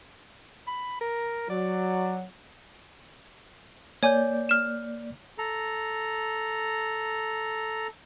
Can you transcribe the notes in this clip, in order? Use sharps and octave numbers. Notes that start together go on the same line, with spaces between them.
B5
A#4
F#3 D5
A#3 C#5 D5 G#5 G6
F6 E7
A4 A#5